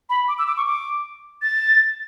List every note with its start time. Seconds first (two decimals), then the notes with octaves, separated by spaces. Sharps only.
0.09 B5
0.28 D6
0.38 E6
0.47 D6
0.57 C#6
0.66 D6
1.42 A6